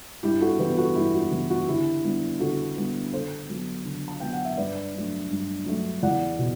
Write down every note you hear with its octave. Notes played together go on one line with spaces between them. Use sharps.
G2 E4 G4
F#4 A4
E3 B3 G4 B4
F#4 A4
G2 E4 G4
F#4
E3 B3
F#4
D3 E4 G4
G3 B3 D4
D3 F#4 A4
G3 B3 D4
D3 A4 C5
F#3 B3
D3
A5
F#3 B3 G5
F#5
E5
G2 B4 D5
F#3 A3 D4
G2
F#3 A3 D4
E2 D5 F#5
B2